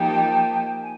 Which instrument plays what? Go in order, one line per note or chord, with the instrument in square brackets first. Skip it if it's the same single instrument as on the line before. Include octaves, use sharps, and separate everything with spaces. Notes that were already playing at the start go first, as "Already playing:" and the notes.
Already playing: [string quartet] F3 A#3 D#4 G4 [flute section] G5 A5
[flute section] G#5